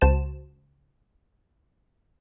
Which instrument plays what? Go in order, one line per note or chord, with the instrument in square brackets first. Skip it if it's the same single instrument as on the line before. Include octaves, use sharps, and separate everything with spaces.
[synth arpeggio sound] C#2 F#4 C5 A5 E7